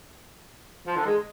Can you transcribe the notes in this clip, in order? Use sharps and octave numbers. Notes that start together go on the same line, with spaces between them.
F3
D3
G#3